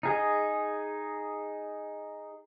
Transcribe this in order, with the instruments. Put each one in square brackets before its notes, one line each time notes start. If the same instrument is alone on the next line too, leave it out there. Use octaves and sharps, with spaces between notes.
[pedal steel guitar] D#4 G#4 D#5